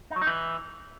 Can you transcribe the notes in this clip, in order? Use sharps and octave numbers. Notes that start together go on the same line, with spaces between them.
D#4
F#3
D#4
E3